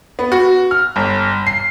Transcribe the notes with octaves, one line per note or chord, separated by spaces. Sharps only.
B3
F#4
F6
G1
C7